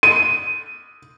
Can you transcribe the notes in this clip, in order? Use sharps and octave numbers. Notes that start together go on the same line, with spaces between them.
D#7